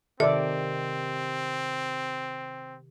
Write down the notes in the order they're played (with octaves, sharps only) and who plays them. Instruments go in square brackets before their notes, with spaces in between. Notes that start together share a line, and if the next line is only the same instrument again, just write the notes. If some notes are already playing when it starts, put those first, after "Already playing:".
[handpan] C3 D#3 [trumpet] C4 [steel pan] A4 D5 [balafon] E5